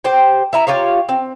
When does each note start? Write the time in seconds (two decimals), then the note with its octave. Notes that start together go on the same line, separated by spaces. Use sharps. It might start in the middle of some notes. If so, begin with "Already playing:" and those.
0.04 G4 C5 G5
0.53 E4 E5 A#5
0.67 F4 G4 C#5 F5
1.09 C4